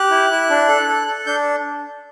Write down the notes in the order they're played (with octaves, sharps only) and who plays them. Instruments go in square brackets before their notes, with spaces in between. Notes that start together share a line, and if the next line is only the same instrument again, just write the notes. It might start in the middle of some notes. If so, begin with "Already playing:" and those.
Already playing: [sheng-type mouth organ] G4 F#6
E4
E4
D4
A4
A4
A4
D4 G6